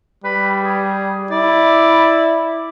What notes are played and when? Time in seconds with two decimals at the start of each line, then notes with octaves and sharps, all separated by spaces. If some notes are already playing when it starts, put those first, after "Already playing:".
0.24 G3 B4
0.64 G#4
1.31 E4 D5